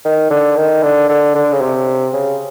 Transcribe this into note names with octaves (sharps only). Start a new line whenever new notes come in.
D#3
D3
D#3
D3
D3
D3
C#3
C3
C#3